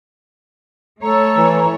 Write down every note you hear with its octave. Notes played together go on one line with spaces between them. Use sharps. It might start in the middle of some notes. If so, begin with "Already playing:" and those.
A3 A4 C#5 A#5
E3